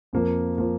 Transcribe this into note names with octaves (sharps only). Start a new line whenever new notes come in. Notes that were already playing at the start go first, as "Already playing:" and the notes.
F2 F3 A#3
F3 A#3